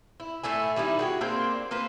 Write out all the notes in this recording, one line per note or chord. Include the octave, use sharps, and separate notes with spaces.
E4
A2 A3 E4 G#5
D#3 G3 D#4 E4
F#4 G#4 G5
A#3 C4 D4 C5
A#3 B4 C5